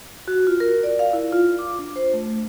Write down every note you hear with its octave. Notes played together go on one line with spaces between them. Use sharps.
F#4
F4
A#4
D5
F5
E4
F4
D6
D4
C5
A3